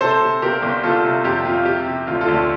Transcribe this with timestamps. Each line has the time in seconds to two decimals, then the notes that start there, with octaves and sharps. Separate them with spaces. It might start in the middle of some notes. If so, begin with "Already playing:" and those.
0.01 C3 A4 C5
0.21 C3
0.42 G1 G4 A#4
0.62 G1
0.83 G1 F4 A4
1.05 C3
1.24 F2 G4
1.45 F2 F4
1.65 C3 G4
1.86 C3
2.07 D2 F4
2.21 F4 A4
2.28 D2
2.35 F4